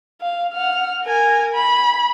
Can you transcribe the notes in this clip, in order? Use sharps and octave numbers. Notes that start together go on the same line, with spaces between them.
F5
F#5 F6
A#4 G#5
B5